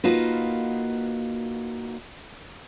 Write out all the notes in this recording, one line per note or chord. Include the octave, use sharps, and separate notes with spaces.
A#3 D#4 F4 F#4 B4